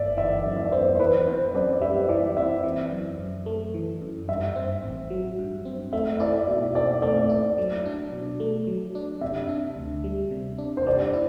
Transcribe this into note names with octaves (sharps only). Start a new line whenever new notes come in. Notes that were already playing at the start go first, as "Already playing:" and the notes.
Already playing: G1 D5 E5
E3 E5
F#2
E5
D5
B3 C5
C5
E3 B4
C4 C5
F#2 D5
G3 E5
E3 D5
C4 E5
E3
F#2
F#2
A3
E3
F#2
G2 E5
C4
A1
F#3
G2
C4
A3 E5
E4 D5
B2 E5
C4 D5
A3 D5
E4 D5
F#3
D4
B2
A3
F#3
D4
C3 E5
D4
D2
G3
C3
D4
C5
G3 D5
E4